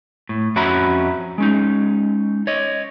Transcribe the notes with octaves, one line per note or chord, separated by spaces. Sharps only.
A2
F2 C#4 F#4 E5 A#5 B5
G#3 C#4 D#4
C#5 D#5